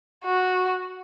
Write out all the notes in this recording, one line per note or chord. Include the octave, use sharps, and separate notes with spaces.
F#4